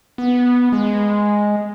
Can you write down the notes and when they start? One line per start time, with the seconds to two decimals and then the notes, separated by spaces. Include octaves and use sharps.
0.18 B3
0.72 G#3